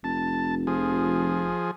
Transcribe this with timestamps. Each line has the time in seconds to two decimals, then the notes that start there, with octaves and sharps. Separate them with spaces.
0.04 F1 A5
0.67 F3 G#4